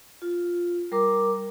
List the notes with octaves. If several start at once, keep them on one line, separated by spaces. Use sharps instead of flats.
F4
G3 A#4 A#5 D6